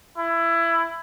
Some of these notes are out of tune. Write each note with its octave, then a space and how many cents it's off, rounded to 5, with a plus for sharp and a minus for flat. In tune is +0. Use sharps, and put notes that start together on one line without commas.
E4 +20